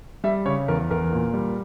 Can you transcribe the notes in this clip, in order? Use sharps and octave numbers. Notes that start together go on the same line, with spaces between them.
G3 E5
C#3 C#5
E2 A#4
E2 A#4
A#2
G3